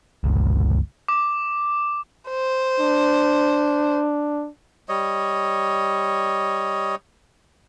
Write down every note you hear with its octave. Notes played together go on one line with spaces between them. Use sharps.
G1 C#2
D6
C5
D4
G3 C#5 D#5